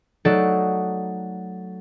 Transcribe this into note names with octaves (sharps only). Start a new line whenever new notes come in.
F#3 A3 D#4 A4 D5 F#5